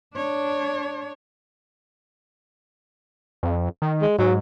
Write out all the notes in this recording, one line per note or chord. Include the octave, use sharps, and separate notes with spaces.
D4 C#5
F2
D#3
G#3
G#2 F#3